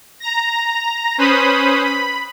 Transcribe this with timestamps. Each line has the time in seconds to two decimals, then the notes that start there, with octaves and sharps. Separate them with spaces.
0.20 A#5 A#6
1.18 C#4 B4 C5 B5 D#6
1.85 B5